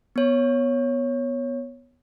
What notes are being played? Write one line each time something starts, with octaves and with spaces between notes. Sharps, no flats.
B3 C#5